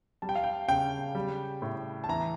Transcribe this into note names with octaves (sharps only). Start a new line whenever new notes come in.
G3 A5
G5
F5
G5
C#3 G5
G3
A2
A5
E3 A#5